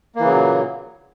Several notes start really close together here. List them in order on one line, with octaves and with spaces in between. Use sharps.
A#3 E3 C#3 F#3 A#2